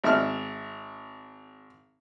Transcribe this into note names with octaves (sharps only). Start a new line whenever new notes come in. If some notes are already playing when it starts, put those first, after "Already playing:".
G#1 E5 F6